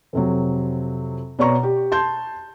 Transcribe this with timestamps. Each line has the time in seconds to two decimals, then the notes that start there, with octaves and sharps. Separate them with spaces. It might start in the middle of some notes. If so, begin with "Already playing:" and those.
0.13 F2 C3 F#3
1.39 B2 C#5 D5 A#5 C#6
1.63 G4
1.92 A5 C6 G6